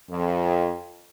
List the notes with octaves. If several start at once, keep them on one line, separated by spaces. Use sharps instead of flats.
F2